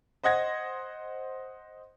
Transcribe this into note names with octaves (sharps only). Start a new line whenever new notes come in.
C5 D#5 F#5 G#6 A#6